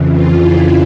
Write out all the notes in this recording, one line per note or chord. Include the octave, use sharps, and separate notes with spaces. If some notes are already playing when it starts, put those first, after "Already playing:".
Already playing: F2 C#3 E3
F4
E4